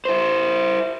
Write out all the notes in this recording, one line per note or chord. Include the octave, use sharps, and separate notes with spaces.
E4 C5